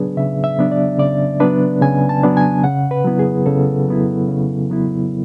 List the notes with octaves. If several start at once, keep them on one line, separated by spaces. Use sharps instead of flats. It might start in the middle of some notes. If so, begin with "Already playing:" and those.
Already playing: C#3 F#3 B3 D4 G#4 B4 D5
C#3 E5
E5
F#3 B3 D4
D5
C#3 D5
F#3 B3 D4 B4
C#3 G#5
A5
F#3 B3 D4
G#5
C#3 F#5
B4
F#3 B3 E4
G#4
C#3 A4
F#3 B3 E4
C#3
F#3 B3 E4